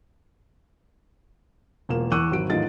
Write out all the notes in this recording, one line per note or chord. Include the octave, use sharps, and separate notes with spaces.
E1 A#3 F4 E7
E2 C#6 D6 E6 F#6 D#7
G#1 F#3 D7
A1 D#3 A3 F4 D#5 A6